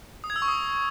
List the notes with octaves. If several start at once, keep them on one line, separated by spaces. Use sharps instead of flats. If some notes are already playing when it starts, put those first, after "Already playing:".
D#6
G#6
E6
C#6
D#6